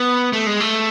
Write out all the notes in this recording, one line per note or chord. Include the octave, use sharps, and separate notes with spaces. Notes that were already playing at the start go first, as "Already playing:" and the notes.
Already playing: B3
A3
G#3
A3